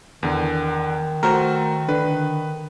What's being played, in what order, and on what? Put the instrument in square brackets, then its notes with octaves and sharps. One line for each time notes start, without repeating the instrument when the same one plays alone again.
[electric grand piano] E2 D3 [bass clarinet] D#3
[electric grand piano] A3 F#4 C5 [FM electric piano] A#4
[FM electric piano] D3 [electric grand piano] B4